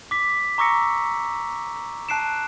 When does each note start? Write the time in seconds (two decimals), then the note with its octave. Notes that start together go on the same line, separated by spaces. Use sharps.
0.11 D6 B6
0.58 A#5 C#6 D6 E6 A#6 C#7
2.09 A5 F#6 C7 D7 E7